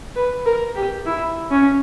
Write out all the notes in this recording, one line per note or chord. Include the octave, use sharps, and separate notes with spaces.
B4
A#4
G4
E4
C#4